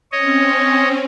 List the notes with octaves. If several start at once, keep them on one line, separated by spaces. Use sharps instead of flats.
C4 C#4 C#5 D#5